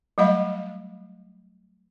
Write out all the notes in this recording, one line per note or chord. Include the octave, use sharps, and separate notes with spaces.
F#3 G3 A3 D#5 F5 B5